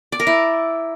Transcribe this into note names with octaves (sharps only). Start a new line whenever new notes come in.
D5
A#4
E4